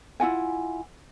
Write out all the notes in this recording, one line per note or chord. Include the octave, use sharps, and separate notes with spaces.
E4 F4 F#5 G#5